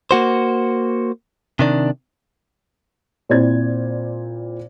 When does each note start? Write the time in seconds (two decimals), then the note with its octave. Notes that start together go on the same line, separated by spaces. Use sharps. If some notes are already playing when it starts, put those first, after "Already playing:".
0.11 A#3 F#4 C5
1.59 C3 D#3 D4
3.29 A#2 C4 E4 C5 D5 G#6